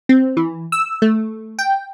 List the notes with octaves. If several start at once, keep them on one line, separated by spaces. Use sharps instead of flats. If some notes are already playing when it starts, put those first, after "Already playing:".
C4
E3
E6
A3
G5